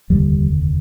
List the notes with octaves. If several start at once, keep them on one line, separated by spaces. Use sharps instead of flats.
F1 D#2 D3 G3